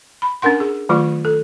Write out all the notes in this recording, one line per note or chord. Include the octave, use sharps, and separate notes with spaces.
B5
C#4 D4 A#4 F#5 C6
G#4
D#3 F#3 A3 F4 C#6
A4